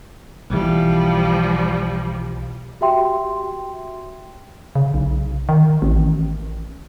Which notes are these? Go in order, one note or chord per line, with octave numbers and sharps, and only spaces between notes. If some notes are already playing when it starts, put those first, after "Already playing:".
B1 E3 F3 G3
F#4 G4 E5 G5 C6
C#3
B1
D#3
A1